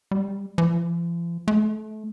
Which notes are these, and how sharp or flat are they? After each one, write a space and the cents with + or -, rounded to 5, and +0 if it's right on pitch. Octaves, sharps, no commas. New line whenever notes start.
G3 +20
F3 -45
A3 -30